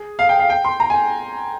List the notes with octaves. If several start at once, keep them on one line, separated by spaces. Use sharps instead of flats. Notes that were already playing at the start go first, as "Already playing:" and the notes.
Already playing: G#4
F5
G5
F5
G5
C6
A#5
G#5